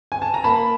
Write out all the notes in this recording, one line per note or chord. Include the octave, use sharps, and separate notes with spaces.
G#5
A5
A#5
A#3 A5 B5